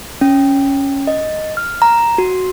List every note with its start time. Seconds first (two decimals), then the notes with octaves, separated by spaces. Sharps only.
0.21 C#4
1.07 D#5
1.57 F6
1.82 A#5
2.18 F#4